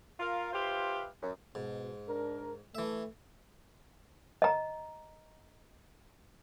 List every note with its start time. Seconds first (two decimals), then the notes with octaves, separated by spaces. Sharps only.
0.19 F4 A#4 F5
0.53 F4 G4 B4 C5 E5 F5
1.22 F#2
1.55 G#2 B2
2.07 D4 A#4
2.75 E3 A3 E5
4.42 D#5 A#5